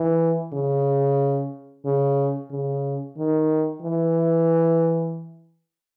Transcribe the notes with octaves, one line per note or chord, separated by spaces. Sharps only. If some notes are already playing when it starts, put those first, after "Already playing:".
Already playing: E3
C#3
C#3
C#3
D#3
E3